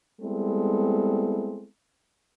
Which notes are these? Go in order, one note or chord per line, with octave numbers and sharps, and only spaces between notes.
G3 G#3 B3 C4 E4 A4